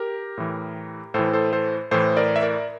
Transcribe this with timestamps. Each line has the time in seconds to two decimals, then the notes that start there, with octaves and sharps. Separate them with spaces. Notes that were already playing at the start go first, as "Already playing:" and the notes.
Already playing: G4 A#4
0.38 A2 E3
1.14 A2 E3 A4 C5
1.33 A4 C5
1.53 A4 C5
1.91 A2 E3 A4 C5
2.17 A#4 D5
2.36 E5
2.42 A#4 D5